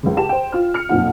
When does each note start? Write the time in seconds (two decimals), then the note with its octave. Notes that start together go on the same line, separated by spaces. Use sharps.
0.03 C#2 C#3
0.17 G4 A5 E7
0.29 C5 G5
0.52 F4 F6
0.74 F6 C#7
0.89 B1 F2 A#2 F3 F#5